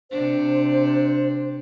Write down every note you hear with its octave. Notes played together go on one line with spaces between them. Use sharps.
C3 D4 C5